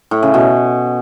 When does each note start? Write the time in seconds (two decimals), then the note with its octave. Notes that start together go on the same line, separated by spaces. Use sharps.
0.11 A2
0.23 C#3
0.34 B2